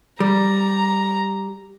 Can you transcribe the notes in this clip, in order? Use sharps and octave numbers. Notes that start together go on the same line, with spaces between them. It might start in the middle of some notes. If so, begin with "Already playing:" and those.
G3 A#5